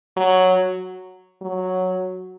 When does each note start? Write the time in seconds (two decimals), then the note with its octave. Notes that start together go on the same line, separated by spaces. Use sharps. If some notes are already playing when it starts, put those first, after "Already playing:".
0.17 F#3
1.42 F#3